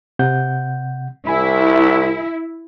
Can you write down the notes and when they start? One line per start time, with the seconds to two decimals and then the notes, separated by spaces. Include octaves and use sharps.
0.19 C3 F#5 G6
1.27 C2 E4 G#5 B5